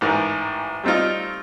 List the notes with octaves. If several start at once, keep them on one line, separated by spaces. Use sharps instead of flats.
A1 G#2 A#4
G3 A3 C4 D#4 F4